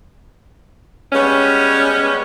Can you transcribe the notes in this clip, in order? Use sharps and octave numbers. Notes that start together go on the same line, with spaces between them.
G3 G#3 B3 C#4